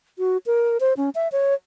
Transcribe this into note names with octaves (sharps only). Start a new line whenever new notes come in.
F#4
A#4
C5
C#4
E5
C#5